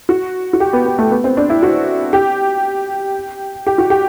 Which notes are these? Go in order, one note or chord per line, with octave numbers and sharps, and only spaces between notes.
F#4
F#4
G4
B3
B3
A3
B3
C4
D4
E4
F#4
G4
G4
F#4
G4